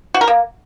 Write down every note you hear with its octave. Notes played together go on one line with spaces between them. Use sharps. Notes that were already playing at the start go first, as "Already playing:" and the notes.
F#4
A#4
A#3